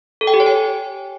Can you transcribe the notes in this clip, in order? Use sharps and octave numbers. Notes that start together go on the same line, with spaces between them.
A4
G5
G4
C#5
G#5